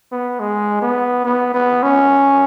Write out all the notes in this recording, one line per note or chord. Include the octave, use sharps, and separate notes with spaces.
B3
G#3
B3
B3
B3
C#4